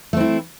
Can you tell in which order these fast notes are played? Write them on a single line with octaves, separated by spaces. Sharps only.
A3 C4 E4